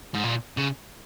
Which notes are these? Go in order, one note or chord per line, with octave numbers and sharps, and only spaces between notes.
G#2
A#2
C#3